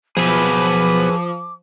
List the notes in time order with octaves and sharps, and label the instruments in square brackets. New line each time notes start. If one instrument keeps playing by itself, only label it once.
[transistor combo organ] B2 F#3 B3 [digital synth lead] F3 [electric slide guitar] G#4 B4 [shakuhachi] D6